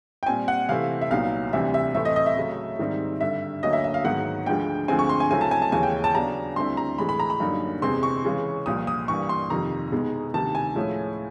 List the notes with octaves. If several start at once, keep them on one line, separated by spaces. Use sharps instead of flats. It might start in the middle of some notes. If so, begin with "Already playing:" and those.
G5
A#2 G3 C4 G#5
F#5
C3 E3 A3 C4 E4 F5
E5
C2 A#2 F#3 B3 D#4 F5
D2 C3 E3 G3 C4 E5
E5
A2 E3 A3 C4 E5
D#5
D#5
E5
C#3 F#3 A3
G#2 D#3 G3 C4 D#4
G2 D3 G3 E5
D2 D3 F#3 A#3 C#4 D#5
E5
E5
F5
G#2 D#3 F#3 B3 F#5
D2 D3 F3 G#3 G5
D2 D3 F3 G#3 C4 G#5
C#6
C6
G#5
C#3 F#3 A3 C4 E4 G#5
A5
G#5
A5
D#2 C#3 E3 G#3 C#4 G#5
G5
A5
C#3 F#3 B3 D4 A#5
D2 D3 G3 C4 E4 C6
A#5
A2 E3 G#3 B5
B5
A#5
B5
F#2 D3 G3 A#3 D#4
E2 C3 E3 G#3 C4 C6
C#6
C#3 E3 G#3 C#4
C2 A#2 F3 D#6
D#6
G2 E3 G3 A#3 C#6
C6
F2 C3 D#3 A#5
B2 G#3 B3 D#4
D2 C3 D#3 A5
G#5
A2 F3 G#3 C#4 E4